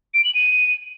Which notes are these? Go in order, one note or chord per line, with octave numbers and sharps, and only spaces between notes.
D7
F#7
D#7